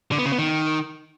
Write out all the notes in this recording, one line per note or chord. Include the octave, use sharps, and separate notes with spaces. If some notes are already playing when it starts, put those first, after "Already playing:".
D3
B3
C#3
B3
D#3